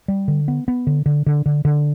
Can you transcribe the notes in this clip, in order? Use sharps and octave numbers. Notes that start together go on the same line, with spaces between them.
G3
D3
B3
B3
D3
D3
D3
D3
D3